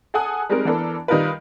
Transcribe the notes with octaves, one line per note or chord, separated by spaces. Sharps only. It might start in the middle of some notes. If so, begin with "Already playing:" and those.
G#4 A4 F#5 G#5 D#6 F#6
G3 G#3 C4 D#4 A#4
E3 B3 D4 A4 A#4
D#3 G3 D#4 F4 A#4 B4